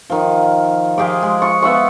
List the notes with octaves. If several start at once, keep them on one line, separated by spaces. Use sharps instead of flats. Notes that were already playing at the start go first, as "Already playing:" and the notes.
D#3 F3
F3 G4 G#4 D6
G#3
F4 C#6
B3 E5 F#5 C#6